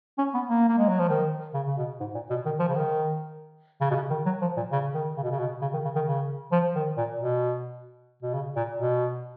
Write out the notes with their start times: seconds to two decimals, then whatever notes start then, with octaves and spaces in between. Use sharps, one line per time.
0.18 C#4
0.34 B3
0.49 A#3
0.68 A#3
0.78 G#3
0.89 F#3
0.99 F3
1.10 D#3
1.54 C#3
1.67 C#3
1.78 B2
2.00 G#2
2.15 A#2
2.30 B2
2.46 D#3
2.59 F3
2.69 C#3
2.76 D#3
3.81 C#3
3.91 B2
3.95 C#3
4.10 D#3
4.26 F#3
4.42 F3
4.57 A#2
4.72 C#3
4.94 D#3
5.17 C#3
5.23 B2
5.31 C#3
5.39 B2
5.62 C#3
5.74 D#3
5.85 C#3
5.95 D#3
6.07 C#3
6.52 F3
6.75 D#3
6.97 A#2
7.20 B2
8.23 B2
8.34 C#3
8.56 A#2
8.79 B2